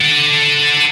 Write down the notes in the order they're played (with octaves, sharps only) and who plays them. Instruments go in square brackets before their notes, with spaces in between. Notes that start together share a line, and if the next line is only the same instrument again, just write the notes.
[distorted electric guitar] A4 F#5